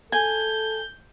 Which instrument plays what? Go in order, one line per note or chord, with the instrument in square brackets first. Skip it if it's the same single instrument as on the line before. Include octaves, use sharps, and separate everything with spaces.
[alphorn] A4 [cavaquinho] G#5 [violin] G6